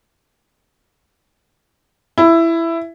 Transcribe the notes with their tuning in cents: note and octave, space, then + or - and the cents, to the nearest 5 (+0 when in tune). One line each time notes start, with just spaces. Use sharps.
E4 +10